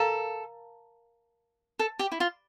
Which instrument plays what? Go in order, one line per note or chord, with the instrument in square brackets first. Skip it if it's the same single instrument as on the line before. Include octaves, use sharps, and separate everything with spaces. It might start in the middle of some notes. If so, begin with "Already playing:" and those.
Already playing: [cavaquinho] A4 [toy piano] A#4 F5 A#5
[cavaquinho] A4
G4
E4
F4